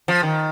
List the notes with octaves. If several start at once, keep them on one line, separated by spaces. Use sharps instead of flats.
F3
D#3